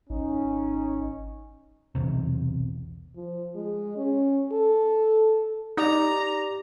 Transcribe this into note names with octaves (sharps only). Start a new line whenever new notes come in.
G#1 C#4 D#4
E1 B1 E2 C3
F3
G#3
C#4
A4
D#4 G4 D5 A#5 D6